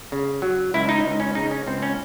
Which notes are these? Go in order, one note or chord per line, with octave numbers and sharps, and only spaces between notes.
C#3
F#3
C#2 E4
D#4
C#2 D#4
C#4
C#3 D#4
C#4
C#2 C4
C#4